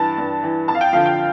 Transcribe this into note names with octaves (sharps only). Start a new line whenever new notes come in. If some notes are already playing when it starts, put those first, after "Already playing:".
Already playing: G2 E3 A5
G2
E3
F2 A5
F5
G5
D3 F3 F5
G5